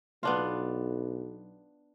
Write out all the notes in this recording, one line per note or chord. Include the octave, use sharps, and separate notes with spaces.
B1 B3 D4 F4